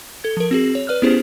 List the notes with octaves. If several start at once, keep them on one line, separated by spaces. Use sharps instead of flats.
A4 G#6
F3 A#4
C4 F#4 G#4
C#5
B4 D5 F6 F#6
B3 C#4 E4 G4 G#4 C5